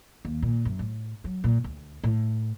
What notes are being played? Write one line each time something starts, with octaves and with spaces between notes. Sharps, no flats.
D#2
A#2
F#2
A2
F#3
A#2
D2
A2